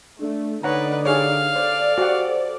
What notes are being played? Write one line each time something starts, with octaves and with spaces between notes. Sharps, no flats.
A3 D4
D3 D#4 B4 C#5 D5 F#5 A#5
G4 G#4 C#5 F5
A4 C5 D5
F#4 G4 C5 F#5